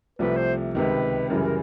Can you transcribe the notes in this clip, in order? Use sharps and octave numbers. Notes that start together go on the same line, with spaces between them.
C2 C3 F3 A3 B4
C5
C#2 C3 D#3 B4
F#2 C#3 E3 G3 A#4
A#4